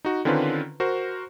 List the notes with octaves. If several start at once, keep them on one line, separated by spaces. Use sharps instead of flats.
D#4 F#4
D3 D#3 C4 C#4 F4 B4
F#4 A#4 C5